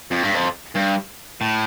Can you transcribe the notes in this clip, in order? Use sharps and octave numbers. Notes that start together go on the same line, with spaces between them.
F2
G2
F2
G2
A2